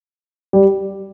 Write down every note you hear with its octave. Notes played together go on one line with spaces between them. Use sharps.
G3